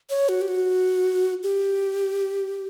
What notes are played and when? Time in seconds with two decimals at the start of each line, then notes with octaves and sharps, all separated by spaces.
0.10 C#5
0.29 F#4
0.41 G4
0.48 F#4
1.43 G4